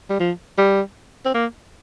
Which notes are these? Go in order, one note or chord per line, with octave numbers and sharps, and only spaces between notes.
G3
F3
G3
C4
A#3